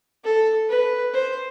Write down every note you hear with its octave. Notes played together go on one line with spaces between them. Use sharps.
A4
B4
C5